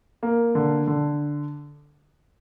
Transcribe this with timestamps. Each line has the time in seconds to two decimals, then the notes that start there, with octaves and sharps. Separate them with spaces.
0.23 A#3
0.55 D3
0.87 D3